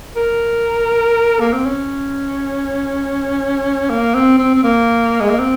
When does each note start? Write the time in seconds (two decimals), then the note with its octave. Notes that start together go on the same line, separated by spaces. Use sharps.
0.16 A#4
1.40 A#3
1.53 C4
1.66 C#4
3.90 A#3
4.14 C4
4.39 C4
4.55 C4
4.63 A#3
5.20 G#3
5.29 A#3
5.39 C4